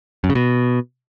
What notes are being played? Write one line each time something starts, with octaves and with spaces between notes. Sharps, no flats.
F#2
C#3
B2